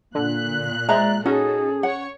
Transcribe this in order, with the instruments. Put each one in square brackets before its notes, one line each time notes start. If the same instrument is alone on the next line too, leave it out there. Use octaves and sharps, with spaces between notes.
[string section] A#2 F#6 [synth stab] D3
[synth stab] G#3 [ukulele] C5 E5 A#5 [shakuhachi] D5
[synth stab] C#4 [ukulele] D#4 F#4 [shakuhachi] G#4 [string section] A4
[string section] C#5 C#6 [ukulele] F#5